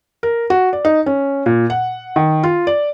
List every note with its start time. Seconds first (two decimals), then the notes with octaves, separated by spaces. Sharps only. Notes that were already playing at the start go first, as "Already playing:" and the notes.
0.23 A#4
0.50 F#4
0.73 D5
0.85 D#4
1.06 C#4
1.46 A#2
1.70 F#5
2.16 D#3
2.43 F4
2.67 D5